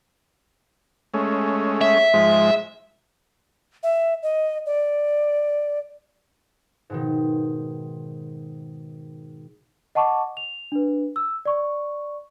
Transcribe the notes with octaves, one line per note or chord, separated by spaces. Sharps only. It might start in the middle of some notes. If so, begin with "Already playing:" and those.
G#3 A3 C#4
E5
G#2 F3 G#3
E5
D#5
D5
G#2 B2 D#3
D#5 F#5 A5 C#6 D6
F7
D4 B4
E6
D5 C#6